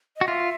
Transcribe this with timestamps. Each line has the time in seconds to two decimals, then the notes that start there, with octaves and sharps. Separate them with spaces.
0.17 F#4 D#5
0.28 F4 E5